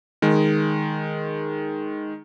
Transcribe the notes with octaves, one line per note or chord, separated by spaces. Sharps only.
D#3 G#3